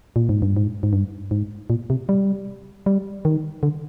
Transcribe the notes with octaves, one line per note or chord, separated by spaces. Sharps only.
A#2
G#2
G2
G#2
G#2
G2
G#2
A#2
C3
G3
G3
D#3
D3